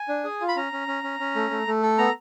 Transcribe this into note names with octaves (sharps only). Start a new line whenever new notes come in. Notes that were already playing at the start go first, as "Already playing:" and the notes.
Already playing: G#5
D4
G#4
F4
B5
C#4 A#5
C#4
C#4
C#4
C#4
A3
A3
A3
A4
B3 A#5